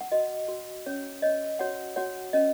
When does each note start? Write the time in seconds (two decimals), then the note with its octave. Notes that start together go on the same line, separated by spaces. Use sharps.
0.01 F#5
0.12 F#4 D#5
0.48 F#4
0.86 C#4 C#5
1.22 C#5 D#5
1.59 F#4 C#5 F#5
1.96 F#4 C#5 F#5
2.33 C#4 D#5